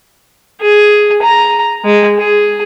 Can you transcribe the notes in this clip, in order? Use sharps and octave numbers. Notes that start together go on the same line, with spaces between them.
G#4
A#5
G#3
G#4